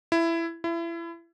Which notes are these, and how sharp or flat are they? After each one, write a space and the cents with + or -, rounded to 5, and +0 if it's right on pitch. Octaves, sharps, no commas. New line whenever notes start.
E4 +15
E4 +30